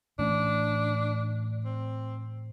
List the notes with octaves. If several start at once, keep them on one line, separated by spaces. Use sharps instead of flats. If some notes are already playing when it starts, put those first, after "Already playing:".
A2 E3 A3 C#4 D4
C4